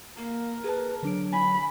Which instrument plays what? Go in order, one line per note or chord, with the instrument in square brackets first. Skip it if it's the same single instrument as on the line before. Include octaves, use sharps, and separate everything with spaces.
[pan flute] A#3 [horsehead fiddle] A#4
[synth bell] G#4 A5 [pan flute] B4
[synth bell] D3 D4 D7 [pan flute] F#3
[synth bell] G#5 [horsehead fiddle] B5